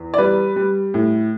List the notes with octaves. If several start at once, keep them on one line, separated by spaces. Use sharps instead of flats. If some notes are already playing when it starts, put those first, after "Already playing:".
Already playing: E2
D5
G3 B4
G3
A2